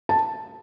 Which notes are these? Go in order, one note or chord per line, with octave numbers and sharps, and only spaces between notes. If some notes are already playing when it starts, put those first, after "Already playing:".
A5